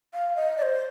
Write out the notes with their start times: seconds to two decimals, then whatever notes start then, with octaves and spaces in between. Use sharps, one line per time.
0.14 F5
0.36 D#5
0.58 D5
0.62 C5